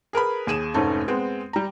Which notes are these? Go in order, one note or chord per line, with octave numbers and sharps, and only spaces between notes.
G#4 A#4 B4 B5
D#2 G#4 D#7 E7
F1 G#2 A3 C#4 D#4 A5
G#3 B3 C4
G3 A#5